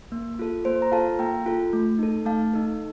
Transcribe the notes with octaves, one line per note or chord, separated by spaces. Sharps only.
A#3
F4 A4
A#3 C5
A#5
F4 A4 F5 A5
A#3 G5 A#5
F4 A4
A3
D#4 A4
A3 F5 A5
D#4 A4